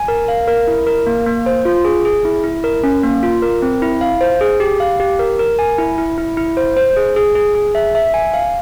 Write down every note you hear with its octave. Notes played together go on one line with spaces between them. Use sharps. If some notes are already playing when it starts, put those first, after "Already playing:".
Already playing: G#5
A#4
F5
A#4
E4
A#4
A#3
A#3
C5
F4
G#4
G#4
E4
E4
A#4
C#4
A#3
F4
A#4
C4
E4
F5
C5
G#4
G4
F5
G4
A#4
A#4
G#5
E4
E4
E4
E4
C5
C5
G#4
G#4
G#4
G#4
E5
E5
G#5
F5